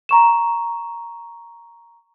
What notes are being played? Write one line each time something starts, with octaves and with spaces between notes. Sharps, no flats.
A#5 C#6 E7